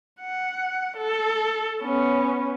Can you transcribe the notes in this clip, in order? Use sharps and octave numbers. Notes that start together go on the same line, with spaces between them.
F#5
A4
B3 C#4